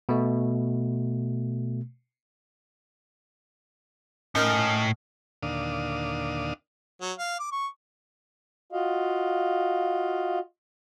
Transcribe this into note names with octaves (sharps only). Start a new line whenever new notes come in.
B2 A3
A2 C#4 D#4 A#4
D#2 A#2 D3 D4 F5 D#6
F#3
F5
D6
C#6
F4 F#4 D#5 F5